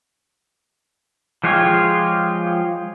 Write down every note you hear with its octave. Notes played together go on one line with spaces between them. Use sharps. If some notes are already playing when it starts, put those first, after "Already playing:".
F3 G#3 F4 G4 C#5